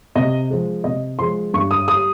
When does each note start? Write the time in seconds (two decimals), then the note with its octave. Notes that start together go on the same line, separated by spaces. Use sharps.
0.16 C3 D#5
0.50 F3 G#3
0.84 C3 D#5
1.19 F3 G#3 C6
1.54 G2 C#6
1.71 D#6
1.88 G3 D#6